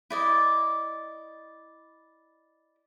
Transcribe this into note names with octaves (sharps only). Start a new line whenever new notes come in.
E4 D5 D#5